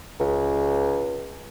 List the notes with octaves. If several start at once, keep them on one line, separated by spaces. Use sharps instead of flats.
C#2